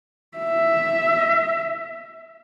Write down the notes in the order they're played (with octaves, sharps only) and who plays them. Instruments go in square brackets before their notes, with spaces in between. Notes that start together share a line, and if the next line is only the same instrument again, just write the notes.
[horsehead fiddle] E5